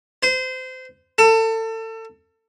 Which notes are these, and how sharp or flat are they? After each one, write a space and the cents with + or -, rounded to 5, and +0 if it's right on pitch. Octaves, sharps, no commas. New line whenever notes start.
C5 -25
A4 +30